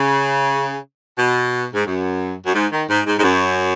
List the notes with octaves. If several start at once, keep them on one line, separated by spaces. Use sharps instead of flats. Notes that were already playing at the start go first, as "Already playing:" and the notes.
Already playing: C#3
B2
G#2
F#2
F#2
G#2
D#3
G#2
G#2
G#2
F#2